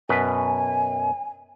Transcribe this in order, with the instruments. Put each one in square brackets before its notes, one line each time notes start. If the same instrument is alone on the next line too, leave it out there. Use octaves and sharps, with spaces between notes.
[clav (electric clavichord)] F#2 B2 B4 [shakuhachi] G#5